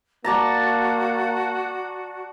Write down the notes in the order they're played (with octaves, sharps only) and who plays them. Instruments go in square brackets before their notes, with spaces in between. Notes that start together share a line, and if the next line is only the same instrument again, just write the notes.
[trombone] A#3 [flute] F#4 [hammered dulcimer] D5 A5 A#5